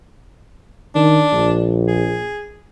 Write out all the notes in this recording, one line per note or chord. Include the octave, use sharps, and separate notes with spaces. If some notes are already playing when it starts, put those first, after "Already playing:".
D#3 D4
A#1
G#4